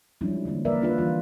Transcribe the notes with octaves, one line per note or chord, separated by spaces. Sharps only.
F3 G3 G#3 C#4 D4 E4
D3 E3 A#3 C#4
F3 A#3 A#4 B4 D5 E5
A#3 C#4 D4 F4 A#4 B4
E3 G3 F4